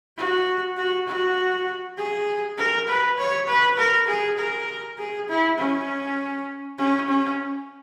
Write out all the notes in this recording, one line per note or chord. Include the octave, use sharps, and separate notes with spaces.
F#4
F#4
F#4
G#4
A#4
B4
C#5
B4
A#4
G#4
A#4
G#4
E4
C#4
C#4
C#4